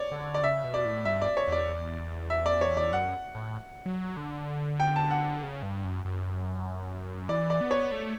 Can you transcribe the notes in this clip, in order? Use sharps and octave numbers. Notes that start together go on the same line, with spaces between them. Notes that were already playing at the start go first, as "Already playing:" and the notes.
Already playing: C#5 D5
D3
D5
C#3 E5
B2
D5
A2
G2 E5
D5
C#5
E2 D5
E5
D5
C#5
D5
F#2 F#5
A2
F#3
D3
G5
A5
F#5
C#3
G2
F#2
F#2
E3 D5
D5
B3
C#5
A3